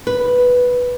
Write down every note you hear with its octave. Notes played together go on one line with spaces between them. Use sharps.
B4